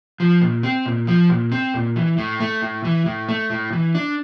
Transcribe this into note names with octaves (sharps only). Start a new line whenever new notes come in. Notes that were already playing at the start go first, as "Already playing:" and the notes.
F3
A#2
C4
A#2
F3
A#2
C4
A#2
E3
A2
A3
A2
E3
A2
A3
A2
E3
D4